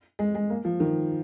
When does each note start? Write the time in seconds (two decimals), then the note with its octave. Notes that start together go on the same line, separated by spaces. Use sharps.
0.19 G#3
0.35 G#3
0.50 A#3
0.65 F3
0.80 D#3